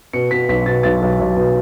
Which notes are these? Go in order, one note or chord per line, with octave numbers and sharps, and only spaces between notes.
B2 C#7
B2 B6
B1 B6
B2 A6
B1 A6
B1
B1
B2